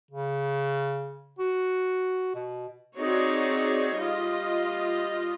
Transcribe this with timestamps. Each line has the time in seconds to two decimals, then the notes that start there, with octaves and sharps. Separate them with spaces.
0.11 C#3
1.39 F#4
2.35 B2
2.97 C4 D#4 F#4 G#4 C#5 D5
3.96 G3 F4 D#5